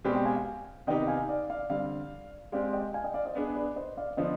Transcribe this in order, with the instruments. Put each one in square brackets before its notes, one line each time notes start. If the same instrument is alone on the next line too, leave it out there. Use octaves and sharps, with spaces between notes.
[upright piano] B2 G#3 C4 G4 C5 [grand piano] B4 D5
[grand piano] D#5 G5
F5 G#5
F5 G#5
[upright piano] C3 D#3 B3 D#4 G4 [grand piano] D#5 G5
[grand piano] F5 G#5
D5 F5
D5 F5
[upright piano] D3 G3 C4 [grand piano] D5 F5
[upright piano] G#3 C4 G4 [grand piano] D5 F5
[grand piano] D#5 G5
F5 G#5
D#5 G5
D5 F5
C5 D#5
[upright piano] B3 D4 G#4
[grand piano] B4 D5
C5 D#5
D5 F5
[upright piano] D3 F3 B3 [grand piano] C5 D#5